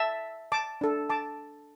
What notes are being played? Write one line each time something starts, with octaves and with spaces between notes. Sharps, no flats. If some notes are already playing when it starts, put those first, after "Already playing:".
Already playing: E5 A5
A5 D6
D4 A4
A5 D6